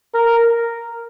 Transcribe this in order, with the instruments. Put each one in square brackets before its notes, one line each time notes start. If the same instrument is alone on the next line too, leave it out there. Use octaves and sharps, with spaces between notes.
[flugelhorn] A#4